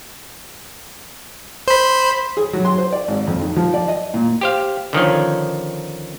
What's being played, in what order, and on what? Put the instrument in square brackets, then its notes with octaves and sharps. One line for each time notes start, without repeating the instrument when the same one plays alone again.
[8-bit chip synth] C5 B5
[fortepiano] G#4
F#3
C6
C5
D5
G#1
F2
D#3
F3
D5
D#5
A#2
[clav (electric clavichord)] G4 C5 F5
D3 D#3 F3 C#4